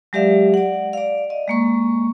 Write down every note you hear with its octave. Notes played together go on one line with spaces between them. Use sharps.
F#3 G#3 G4 D5 E5 F5
D5 F#5
D5 F5
D#5
G#3 A#3 C#6